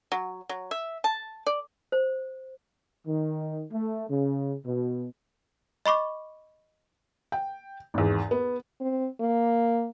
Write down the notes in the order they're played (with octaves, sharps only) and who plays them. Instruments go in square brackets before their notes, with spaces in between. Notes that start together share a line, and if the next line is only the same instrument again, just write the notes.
[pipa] F#3
F#3
E5
A5
D5
[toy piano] C5
[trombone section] D#3
A3
C#3
B2
[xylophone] D#5 B5 C#6 D6
[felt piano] G5
G#1 E2
B3
[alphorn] C4
A#3